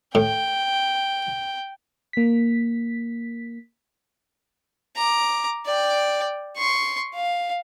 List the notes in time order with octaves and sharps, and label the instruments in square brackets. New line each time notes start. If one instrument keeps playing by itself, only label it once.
[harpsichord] A2 [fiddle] G5
[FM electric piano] A#3 B6
[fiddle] A#5 D6
D5 G5
C6 C#6
F5